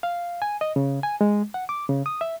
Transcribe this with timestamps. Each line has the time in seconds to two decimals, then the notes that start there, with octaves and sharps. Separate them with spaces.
0.03 F5
0.42 G#5
0.61 D#5
0.76 C#3
1.03 G#5
1.21 G#3
1.54 F#5
1.69 D6
1.89 C#3
2.06 D#6
2.21 E5